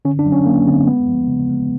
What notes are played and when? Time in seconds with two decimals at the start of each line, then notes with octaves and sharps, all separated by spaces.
0.05 D3 C#4
0.19 D4
0.26 F#3
0.32 C#4
0.46 F#3 A#3
0.68 D3 C4
0.87 G#3 B3
1.08 F3
1.28 C#3
1.49 G#3